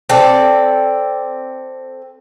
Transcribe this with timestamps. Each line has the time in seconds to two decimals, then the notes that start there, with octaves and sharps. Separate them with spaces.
0.10 C4 A4 D5